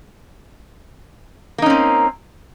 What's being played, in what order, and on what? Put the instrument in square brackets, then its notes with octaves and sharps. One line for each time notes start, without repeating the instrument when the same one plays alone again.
[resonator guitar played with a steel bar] A#3
D#4
C#4
C4